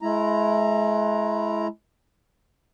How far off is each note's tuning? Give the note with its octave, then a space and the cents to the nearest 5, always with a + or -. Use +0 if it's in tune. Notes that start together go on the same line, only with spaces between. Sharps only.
G#3 +35 E4 +15 A#5 +0